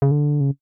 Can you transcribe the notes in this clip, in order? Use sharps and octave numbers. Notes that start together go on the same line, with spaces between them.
C#3
D3
C#3